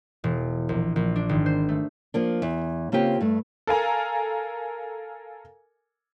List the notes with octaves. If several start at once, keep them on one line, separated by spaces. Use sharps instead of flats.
E1
A#1
A#1
D4
G#1
C5
A3
F3 A#3 D4
E2
C#3 A#3 C4 F4 G4
G2 A3
A4 A#4 F5 G#5 A#5